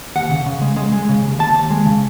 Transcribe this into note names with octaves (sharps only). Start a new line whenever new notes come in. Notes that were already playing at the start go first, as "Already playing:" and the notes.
D#2 F#5
C#3
C#3
G#3
G#3
G#3
C#3
D#2
D#2 A5
D#2
G#3
C#3